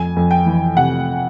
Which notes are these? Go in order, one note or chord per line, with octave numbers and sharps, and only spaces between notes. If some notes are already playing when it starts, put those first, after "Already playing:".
Already playing: F2 G#5
F2
G5
E3
C3 F#5